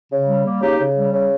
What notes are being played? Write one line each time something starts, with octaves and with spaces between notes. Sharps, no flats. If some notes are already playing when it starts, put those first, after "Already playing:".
C#3
G3
A#3
C#3 D#4 G4
C#3
G3
C#3